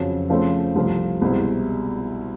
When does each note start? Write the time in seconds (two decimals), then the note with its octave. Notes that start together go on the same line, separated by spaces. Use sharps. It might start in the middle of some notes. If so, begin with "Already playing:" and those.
Already playing: F2 C#3 F#3
0.30 C#3 F3 A3 C4
0.75 C2 C3 F3 A3
1.21 C2 B2 G#3 C4 E4